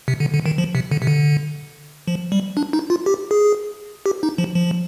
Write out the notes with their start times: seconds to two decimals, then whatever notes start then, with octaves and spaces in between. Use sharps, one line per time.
0.08 C3
0.20 D3
0.34 D3
0.46 D#3
0.58 F3
0.75 C3
0.91 D3
1.02 C3
1.07 D3
2.08 F3
2.32 G3
2.57 D4
2.73 D#4
2.90 F4
3.06 G4
3.31 G#4
4.06 G4
4.23 D#4
4.38 F3
4.55 F3